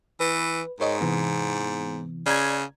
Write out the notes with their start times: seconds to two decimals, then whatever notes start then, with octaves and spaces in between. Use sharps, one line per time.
0.20 E3 B4
0.80 G#2 A#4 C#5 D#5
1.01 C3 E3 B3
2.26 C#3 D5 A#5 G#6